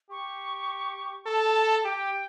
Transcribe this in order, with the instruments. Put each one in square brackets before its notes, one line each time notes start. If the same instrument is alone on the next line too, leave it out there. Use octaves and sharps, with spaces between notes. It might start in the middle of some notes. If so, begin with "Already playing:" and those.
[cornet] G4 [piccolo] C#6
[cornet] A4 [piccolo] A5
[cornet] G4 [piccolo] G5